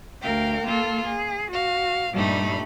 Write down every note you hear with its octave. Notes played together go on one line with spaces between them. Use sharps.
D2 A#4 F5 G5
A#3 F4 A4
G#4
F#4 F5
G2 A#2 G3 A3 D#4 B5